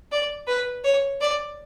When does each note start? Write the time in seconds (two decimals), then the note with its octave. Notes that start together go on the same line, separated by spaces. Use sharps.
0.12 D5
0.48 B4
0.84 C#5
1.21 D5